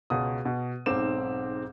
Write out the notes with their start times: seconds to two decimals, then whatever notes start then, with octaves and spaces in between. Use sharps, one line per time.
0.10 C#2 B2 D#6
0.45 B2
0.86 B1 G#2 C4 D6 E7